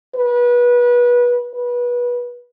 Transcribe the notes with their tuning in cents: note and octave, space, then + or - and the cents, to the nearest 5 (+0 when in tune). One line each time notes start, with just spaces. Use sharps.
B4 -25
B4 -25